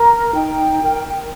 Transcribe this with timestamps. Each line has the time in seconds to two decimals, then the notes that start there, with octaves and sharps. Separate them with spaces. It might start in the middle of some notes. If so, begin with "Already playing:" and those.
Already playing: A#4 A#5
0.34 D#4 G5
0.82 A#4